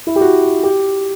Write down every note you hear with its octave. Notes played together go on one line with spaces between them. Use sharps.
E4
G4
F#4
G4